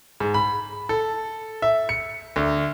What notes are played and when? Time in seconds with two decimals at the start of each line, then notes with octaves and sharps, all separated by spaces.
0.20 G#2
0.34 B5
0.89 A4
1.62 E5
1.89 C#7
2.36 D2